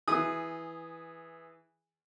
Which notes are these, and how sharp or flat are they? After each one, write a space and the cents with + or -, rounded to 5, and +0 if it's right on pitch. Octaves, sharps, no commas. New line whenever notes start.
E3 +0 G#4 +0 D#6 -15